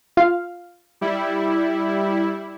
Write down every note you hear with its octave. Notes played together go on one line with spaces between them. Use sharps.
F4 F5
G3 E4